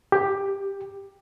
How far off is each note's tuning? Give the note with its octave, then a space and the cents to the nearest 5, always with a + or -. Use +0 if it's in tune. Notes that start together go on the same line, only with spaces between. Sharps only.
G4 +10